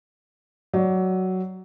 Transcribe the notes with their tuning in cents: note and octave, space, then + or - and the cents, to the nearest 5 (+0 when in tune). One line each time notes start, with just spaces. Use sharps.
F#3 +10 D5 +10